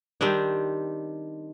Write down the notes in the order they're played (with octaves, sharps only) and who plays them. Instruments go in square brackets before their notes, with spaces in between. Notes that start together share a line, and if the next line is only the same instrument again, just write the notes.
[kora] D#3 G3 C4 D4